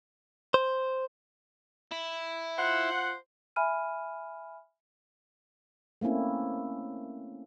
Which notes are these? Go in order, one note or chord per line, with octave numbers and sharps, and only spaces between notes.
C5
E4
F4 C5 F#5
E5 G#5 B5 F6 D#7
A3 A#3 C4 C#4 E4